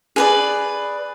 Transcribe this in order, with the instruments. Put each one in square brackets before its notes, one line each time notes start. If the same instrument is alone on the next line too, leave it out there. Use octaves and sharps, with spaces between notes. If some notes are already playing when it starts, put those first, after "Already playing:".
[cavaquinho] G#4 B4 D5